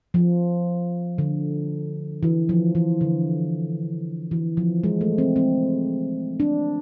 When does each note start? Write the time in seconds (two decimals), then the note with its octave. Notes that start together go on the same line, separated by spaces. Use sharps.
0.14 F3
1.18 D3
2.23 E3
2.49 F3
2.75 E3
3.01 D3
4.31 E3
4.57 F3
4.84 G#3
5.01 A3
5.18 C4
5.36 C4
6.40 D4